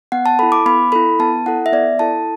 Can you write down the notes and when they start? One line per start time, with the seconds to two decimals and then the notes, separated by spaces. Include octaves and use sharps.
0.12 B3 F#5
0.26 A5
0.39 E4 A4 B5
0.52 D6
0.66 B3 B5
0.92 E4 A4 B5
1.19 B3 A5
1.46 E4 A4 F#5
1.66 E5
1.72 B3 D5
1.99 E4 A4 A5